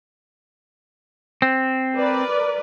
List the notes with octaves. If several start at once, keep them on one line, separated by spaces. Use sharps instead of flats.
C4
A#4 B4 D5